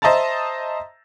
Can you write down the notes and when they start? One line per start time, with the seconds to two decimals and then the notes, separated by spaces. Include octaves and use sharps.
0.02 C5 D#5 E5 A5 A#5 A6